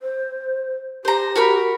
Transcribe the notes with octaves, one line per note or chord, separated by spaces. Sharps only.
C5
G4 C5 A#5
F#4 A#4 B5